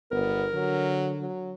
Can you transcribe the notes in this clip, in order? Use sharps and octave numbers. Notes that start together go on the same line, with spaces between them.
G1 B3 A#4
D3 F#3
F#3